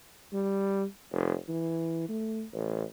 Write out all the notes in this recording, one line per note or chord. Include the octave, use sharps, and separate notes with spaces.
G3
F1
E3
A3
A1